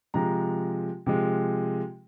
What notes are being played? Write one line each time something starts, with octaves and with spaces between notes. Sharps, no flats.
C3 F3 G#3 A#5
C3 F3 G#3